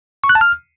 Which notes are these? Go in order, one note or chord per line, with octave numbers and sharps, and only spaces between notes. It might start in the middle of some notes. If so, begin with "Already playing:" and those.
C#6
F#6
A5
F6